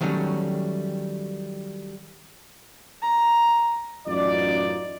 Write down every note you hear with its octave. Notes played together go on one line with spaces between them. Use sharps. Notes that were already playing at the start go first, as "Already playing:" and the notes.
D#3 F#3 G3 A3 C#4
A#5
A1 F#2 D#4 F4 D5